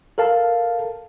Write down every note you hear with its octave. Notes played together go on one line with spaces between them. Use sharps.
A4 A#4 F5 A5